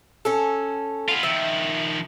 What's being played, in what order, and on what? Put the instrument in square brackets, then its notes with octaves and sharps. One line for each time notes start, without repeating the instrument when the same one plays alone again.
[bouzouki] C#4 A4
[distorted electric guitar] B3 F4
[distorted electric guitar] D#3 F3 [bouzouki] E5